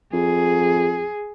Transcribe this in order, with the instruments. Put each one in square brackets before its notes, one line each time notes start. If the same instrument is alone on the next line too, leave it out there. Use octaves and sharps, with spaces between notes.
[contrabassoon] F2 [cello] G#4